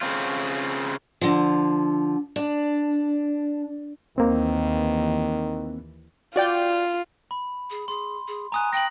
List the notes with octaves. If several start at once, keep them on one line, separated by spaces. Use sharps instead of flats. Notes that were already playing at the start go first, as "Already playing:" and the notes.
C#3 C4 F4
D3 F3
D4
D#2 D#3 E3 A#3 C4
F4 F#4 D5 G5
B5
G#4
G#4 C6
G#4
G#5 A#5 D#6 F#6
G5 A#6 F#7